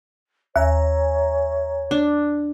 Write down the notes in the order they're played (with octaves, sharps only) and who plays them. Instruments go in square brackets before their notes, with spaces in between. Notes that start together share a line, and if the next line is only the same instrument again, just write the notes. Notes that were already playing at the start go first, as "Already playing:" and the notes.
[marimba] D#2 [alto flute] C#5 [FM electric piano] E5 G#5 A#5
[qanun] D4